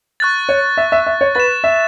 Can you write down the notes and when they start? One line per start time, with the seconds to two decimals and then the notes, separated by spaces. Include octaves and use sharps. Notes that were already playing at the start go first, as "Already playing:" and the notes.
0.20 C#6 F#6 A6
0.49 C#5
0.77 E5
0.92 E5
1.06 E5
1.21 C#5
1.35 B4 A6
1.40 E7
1.64 E5